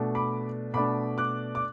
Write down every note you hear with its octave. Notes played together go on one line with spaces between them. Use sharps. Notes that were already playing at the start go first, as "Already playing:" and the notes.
Already playing: B2 A3 D4
B5 D6
B2 A3 D4 B5 D6
D6 F#6
D6